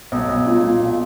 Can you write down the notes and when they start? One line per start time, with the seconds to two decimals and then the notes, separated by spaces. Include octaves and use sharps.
0.12 B1
0.29 B1
0.46 A#2
0.64 A#2
0.80 B1